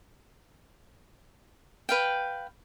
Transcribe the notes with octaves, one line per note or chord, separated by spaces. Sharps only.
B4 F5 G5